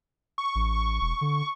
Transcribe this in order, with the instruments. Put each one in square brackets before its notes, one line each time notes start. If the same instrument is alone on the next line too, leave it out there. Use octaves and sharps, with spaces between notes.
[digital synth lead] C#6
[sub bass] A1
E1
D3